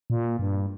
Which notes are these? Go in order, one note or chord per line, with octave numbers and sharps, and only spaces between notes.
A#2
G2